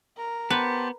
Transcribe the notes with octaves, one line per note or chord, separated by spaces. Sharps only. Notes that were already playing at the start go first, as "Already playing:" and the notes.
A#4
B3 G4 B4 C5 A5